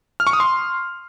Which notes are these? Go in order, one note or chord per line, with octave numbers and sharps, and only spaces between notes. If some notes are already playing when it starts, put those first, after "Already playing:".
F6
C#6
D#6
C6